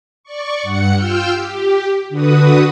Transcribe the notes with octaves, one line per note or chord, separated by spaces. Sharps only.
D5 C#6
G2 F#5 C#7
F4 G5 E6 F6 G6
G4
D3 F#4 B4 D#6